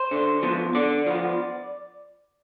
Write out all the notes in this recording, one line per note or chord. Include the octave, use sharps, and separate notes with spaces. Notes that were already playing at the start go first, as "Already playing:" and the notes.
Already playing: C5
D3
F3 B3
D3 D5
F3 B3